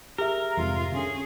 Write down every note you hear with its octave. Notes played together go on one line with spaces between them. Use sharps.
G4 G#4 A#4 E5
F1 G#2 C3 F4
D3 C#4 G#4